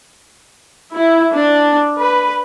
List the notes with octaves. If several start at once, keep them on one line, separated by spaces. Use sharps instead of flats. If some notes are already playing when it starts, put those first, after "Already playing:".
E4
D4
B4